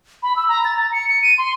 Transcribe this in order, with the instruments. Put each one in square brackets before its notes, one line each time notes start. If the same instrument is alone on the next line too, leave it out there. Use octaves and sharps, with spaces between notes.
[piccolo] B5
E6
A#5
A6
A#5
C#7
C#7
D#7
C6